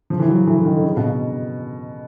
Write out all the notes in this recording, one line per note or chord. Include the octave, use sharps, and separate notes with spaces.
F3
E3
F#3
E3
D3
D#3
D3
C#3
B2